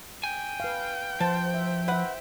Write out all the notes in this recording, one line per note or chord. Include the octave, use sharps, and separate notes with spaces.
G5 G#5
B4 F5
F3 C5 A5
E5
B4 C5 E5 F#5